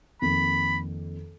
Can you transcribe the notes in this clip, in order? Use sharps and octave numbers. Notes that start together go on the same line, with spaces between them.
F2 D#3 A#3 B5